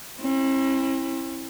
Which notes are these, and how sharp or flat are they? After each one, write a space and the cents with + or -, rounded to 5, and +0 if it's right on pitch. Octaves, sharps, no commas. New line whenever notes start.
C4 +45 E4 +0